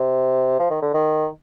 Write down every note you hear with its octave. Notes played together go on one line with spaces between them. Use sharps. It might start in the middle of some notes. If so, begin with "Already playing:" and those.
Already playing: C3
F3
D#3
D3
D#3